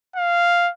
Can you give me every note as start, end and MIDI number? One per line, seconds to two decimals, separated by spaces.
0.16 0.70 77